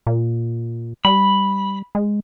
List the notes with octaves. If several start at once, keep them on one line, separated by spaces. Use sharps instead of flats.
A#2
G3 B5
G#3